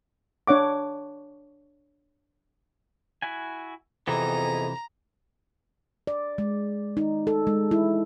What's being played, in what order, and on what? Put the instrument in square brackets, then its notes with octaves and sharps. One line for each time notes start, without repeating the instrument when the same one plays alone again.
[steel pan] D4 C#5 F#5 D6
[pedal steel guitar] E4 F#4 G#5
[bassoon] F2 [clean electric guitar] C3 E3 [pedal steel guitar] B3 D#4 G#4 [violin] A#5
[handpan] D5
G#3
D#4
A4
G#3
E4